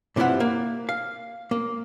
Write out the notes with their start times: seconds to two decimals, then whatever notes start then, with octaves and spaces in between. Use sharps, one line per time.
0.16 G2 C3 E3 F3 E4 F#5
0.40 A#3
0.89 F5
1.51 A#3